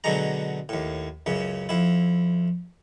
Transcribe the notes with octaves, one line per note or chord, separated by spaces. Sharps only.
B2 D3 F#3 G#3 A#5
D#2 A2
C#2 F#2 C#3
F2 E4